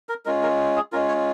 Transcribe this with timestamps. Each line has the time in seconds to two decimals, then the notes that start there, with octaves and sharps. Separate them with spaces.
0.09 A#4
0.25 G#3 C#4 F4 A#4
0.43 A#4
0.76 G#4
0.93 G#3 C#4 F4 A#4
1.08 C#5